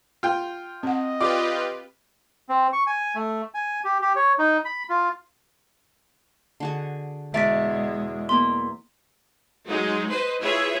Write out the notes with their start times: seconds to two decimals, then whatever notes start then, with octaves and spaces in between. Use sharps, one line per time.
0.23 F4 G5
0.83 C4 D#5 F#5
1.21 F4 G4 B4 D5
2.49 C4
2.73 C#6
2.87 G#5
3.15 A3
3.54 G#5
3.85 G4
4.02 G4
4.16 C#5
4.39 D#4
4.65 B5
4.90 F4
6.60 D3 F#4 G#4
7.34 E2 B2 G#3 A#4 D5 E5 A6 B6
8.29 A#3 B3 B5 C6
9.66 F#3 G#3 D#4
10.09 B4 C5 D#5
10.40 E4 F4 G#4 B4 C#5 E5